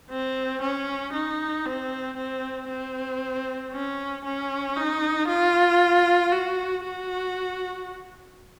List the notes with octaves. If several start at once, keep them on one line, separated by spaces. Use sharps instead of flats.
C4
C#4
D#4
C4
C4
C4
C#4
C#4
D#4
F4
F#4
F#4